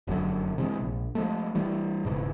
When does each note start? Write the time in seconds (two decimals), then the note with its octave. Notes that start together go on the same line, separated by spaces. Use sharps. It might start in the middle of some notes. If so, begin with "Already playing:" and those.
0.07 F1 F#2 D3 F#3
0.58 C3 E3 G3 G#3
0.81 A#1
1.15 F3 G#3 A3
1.55 E3 G3
2.05 E1 G#2 C#3 E3